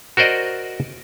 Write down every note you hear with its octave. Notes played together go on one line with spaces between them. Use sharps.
F#4 A#4 C5 D5 D#5